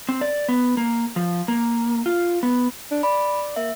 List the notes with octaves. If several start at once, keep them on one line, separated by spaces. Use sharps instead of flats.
C4
D5
B3
A#3
F3
A#3
F4
B3
D4
D5 B5
A#3 E5